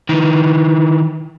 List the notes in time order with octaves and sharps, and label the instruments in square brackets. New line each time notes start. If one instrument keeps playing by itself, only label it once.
[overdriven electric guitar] D#3 E3